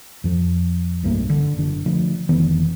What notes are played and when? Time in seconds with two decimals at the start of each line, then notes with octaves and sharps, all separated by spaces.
0.24 F2 F3
1.03 B1 G2 A3 A#3
1.29 D3
1.56 F#1 D3
1.86 D3 F3 A3 D4
2.29 F1 D#3 E3 B3